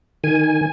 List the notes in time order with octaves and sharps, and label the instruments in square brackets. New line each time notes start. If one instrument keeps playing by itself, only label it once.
[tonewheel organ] D#3 G#5